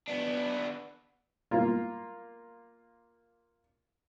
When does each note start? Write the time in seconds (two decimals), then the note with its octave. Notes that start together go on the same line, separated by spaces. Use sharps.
0.08 B3 D4
1.51 A#3 F4